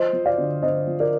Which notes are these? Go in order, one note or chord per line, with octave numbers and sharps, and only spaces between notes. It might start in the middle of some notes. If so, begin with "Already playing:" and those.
Already playing: F3 C5 D#5
F3
D5 F5
D3
D3 C5 D#5
F3
A#4 D5